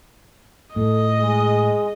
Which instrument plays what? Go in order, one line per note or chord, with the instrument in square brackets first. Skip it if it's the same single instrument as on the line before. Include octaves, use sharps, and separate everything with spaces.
[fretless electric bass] A2 [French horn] A4 [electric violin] D#5
[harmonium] G#3 [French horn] G#4